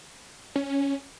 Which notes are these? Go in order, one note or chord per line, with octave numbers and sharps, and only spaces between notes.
C#4